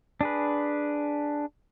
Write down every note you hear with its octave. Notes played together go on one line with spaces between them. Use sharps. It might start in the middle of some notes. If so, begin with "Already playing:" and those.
D4 G#4 B4